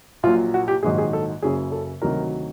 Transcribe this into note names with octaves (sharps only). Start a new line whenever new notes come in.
A#1 A#2 F#3 F4
F#4
G4
A#1 G#2 D#3 F#3 G#4
G#4
A4
F#1 F#2 C#3 G#4
A4
D2 C3 D#3 F#3 A#4